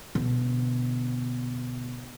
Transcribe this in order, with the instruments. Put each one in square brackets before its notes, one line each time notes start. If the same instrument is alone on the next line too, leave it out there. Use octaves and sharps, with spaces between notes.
[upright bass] B2 D3